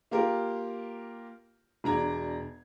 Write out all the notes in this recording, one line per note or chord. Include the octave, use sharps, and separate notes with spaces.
A#3 F4 G4 A#4
E1 D4 A#5 G#6